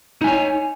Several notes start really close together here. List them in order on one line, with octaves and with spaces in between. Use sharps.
D#4 G#5 C#5